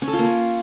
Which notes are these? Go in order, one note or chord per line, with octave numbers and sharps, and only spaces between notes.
C#4
A4
F4
A#3
C#4